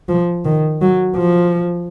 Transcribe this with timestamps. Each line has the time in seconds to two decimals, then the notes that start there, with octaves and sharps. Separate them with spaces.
0.09 F3
0.45 D#3
0.82 F#3
1.16 F3